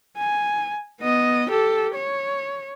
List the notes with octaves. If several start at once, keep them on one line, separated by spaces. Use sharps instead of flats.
G#5
B3 D#5
G4 A4
C#5